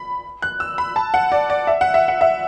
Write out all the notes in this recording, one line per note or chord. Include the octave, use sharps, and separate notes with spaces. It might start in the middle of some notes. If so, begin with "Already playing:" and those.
Already playing: B5
F#6
E6
B5
A5
F#5
D5
D5
E5
F#5
E5
F#5
E5